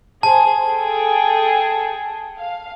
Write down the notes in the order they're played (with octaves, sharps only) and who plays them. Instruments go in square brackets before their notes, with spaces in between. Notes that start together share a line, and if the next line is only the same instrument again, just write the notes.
[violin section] G#4 C5 [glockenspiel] A5
[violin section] G#4 A4 G5
F5